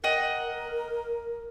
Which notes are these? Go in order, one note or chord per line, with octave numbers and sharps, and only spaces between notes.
A#4 D#5 F#5 G5